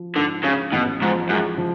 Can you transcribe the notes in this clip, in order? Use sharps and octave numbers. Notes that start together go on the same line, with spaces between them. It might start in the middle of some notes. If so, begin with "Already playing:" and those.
Already playing: F3
G#2 D3
C#3 G#3
A1 B2
G#2 F3
F#2 G#3
F3